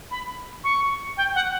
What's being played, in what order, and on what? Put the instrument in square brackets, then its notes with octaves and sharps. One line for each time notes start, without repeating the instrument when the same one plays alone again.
[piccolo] B5
C#6
G5
F#5